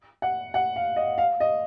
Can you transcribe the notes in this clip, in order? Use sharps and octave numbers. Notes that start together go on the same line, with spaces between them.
F#5
F#5
F5
D#5
F5
D#5